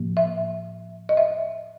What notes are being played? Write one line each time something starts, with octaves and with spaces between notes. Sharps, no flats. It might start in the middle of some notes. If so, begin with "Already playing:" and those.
Already playing: A2 F3 A#3
E5
D#5
E5